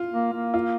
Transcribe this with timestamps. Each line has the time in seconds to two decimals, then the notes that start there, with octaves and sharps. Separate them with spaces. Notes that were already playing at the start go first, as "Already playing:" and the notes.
Already playing: F4
0.13 A#3
0.33 A#3
0.54 F4